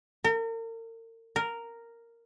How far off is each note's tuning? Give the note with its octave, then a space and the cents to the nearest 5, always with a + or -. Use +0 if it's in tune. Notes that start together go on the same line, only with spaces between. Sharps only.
A#4 -40
A#4 -5